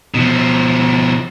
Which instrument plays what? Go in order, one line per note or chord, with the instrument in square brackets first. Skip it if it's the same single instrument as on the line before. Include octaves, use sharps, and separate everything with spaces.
[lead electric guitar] B2 F3